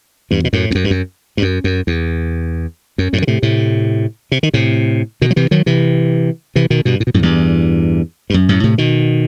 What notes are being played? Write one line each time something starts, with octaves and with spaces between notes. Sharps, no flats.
E2 G2
B2
F#2 A2
E2
F#2
G2
F#2
G2
F#2
F#2
E2
F#2
F#2 A2
D#3
A2 C3
A2 C3
C3
D#3
A2 C3
B2 D#3
F#3
C3 E3
D#3 F#3
C3 E3
C3 E3
B2 D#3
G2 B2
A2
B2
F#2 A2
E2 G2
G2
F#2
F#2 A2
A2 C3
B2 D#3